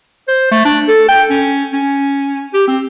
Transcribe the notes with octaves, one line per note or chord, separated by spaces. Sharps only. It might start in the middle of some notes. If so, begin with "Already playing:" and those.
C5
A3
D4
A4
G5
C#4
C#4
G4
C4